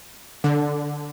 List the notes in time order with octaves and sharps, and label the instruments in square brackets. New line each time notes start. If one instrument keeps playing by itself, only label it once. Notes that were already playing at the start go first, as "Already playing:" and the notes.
[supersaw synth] D3